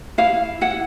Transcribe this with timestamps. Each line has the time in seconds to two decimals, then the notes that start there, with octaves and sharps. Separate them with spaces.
0.18 E4 F5
0.61 E4 F#5